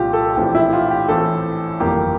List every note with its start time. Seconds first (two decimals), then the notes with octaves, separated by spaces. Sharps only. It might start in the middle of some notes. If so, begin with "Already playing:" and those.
Already playing: C2 A#2 F3 F4 G4
0.13 A4
0.36 A#1 A2 E3 A3 C4 G4
0.55 E4
0.73 F4
0.91 G4
1.08 A1 A2 E3 A3 C4 A4
1.80 G1 F2 E3 A#3 G4